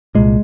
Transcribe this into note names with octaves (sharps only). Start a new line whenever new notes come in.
C2 A#2 G#3